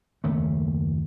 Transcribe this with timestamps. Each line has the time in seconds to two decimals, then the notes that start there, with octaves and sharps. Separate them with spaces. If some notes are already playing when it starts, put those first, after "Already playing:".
0.24 F#1 D#2 A3